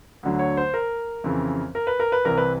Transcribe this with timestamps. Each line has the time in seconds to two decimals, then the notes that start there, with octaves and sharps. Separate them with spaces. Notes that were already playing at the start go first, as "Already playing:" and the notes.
0.23 D2 D3 F#3
0.39 C#5
0.57 C5
0.74 A#4
1.24 F2 C#3 E3
1.75 A#4
1.87 B4
2.00 A#4
2.12 B4
2.25 C2 C3 E3 A#4
2.37 B4